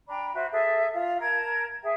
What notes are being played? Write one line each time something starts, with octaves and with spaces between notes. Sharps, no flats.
D4 G5 A#5 B5
F#4 C5 E5
G#4 A4 E5
F4
A#4 A5 A#5 G#6
G#4 E5 G5